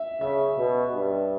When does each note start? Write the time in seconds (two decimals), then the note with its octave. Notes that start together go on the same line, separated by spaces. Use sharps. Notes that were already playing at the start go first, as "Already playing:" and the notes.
Already playing: E5
0.21 C#3 E5
0.58 B2
0.95 G2